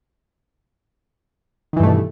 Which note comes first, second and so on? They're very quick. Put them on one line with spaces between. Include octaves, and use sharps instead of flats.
D#3 E3 G2 A3 B2